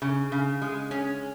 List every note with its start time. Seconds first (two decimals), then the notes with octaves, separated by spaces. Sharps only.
0.02 C#3
0.32 C#3
0.62 G#3
0.91 C#4